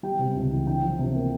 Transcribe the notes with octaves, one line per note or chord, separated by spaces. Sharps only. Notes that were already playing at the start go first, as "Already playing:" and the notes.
G3 G5
C3
C#2
E3
D4 G5
F3
C3
A#3